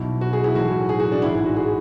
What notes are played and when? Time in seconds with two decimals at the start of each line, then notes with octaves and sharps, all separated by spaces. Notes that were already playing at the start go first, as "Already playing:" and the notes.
Already playing: B1 B2 E4
0.21 F#4
0.33 G#4
0.44 E4
0.55 B1 A2 E3 F#4
0.89 G#4
1.00 F#4
1.12 D4
1.22 A1 G#2 E3 E4
1.35 E4
1.46 F#4
1.56 G#4